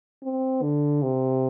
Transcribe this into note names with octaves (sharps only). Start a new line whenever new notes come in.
C4
D3
C3